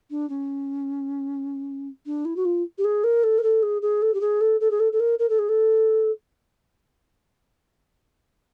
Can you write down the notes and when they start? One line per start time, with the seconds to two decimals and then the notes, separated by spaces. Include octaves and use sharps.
0.10 D4
0.29 C#4
2.06 D4
2.25 E4
2.36 F#4
2.45 F4
2.78 G4
2.84 G#4
3.04 A#4
3.23 A4
3.38 A#4
3.43 A4
3.62 G#4
3.82 G#4
4.02 A4
4.14 G4
4.21 G#4
4.41 A4
4.60 A4
4.70 G#4
4.79 A4
4.92 A4
4.99 A#4
5.19 A#4
5.29 A4
5.38 G#4
5.49 A4